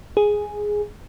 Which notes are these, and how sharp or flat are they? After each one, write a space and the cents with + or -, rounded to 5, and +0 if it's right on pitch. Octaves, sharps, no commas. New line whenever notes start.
G#4 +0